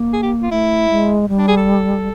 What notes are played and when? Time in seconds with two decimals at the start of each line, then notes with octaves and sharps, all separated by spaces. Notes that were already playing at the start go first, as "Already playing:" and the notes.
Already playing: A#3
0.13 G#4
0.22 G4
0.42 F4
0.51 A3 E4
0.90 G#3
1.29 G3
1.38 D4
1.48 G#4
1.57 A4